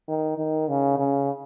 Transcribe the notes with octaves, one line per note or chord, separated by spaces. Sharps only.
D#3
D#3
C#3
C#3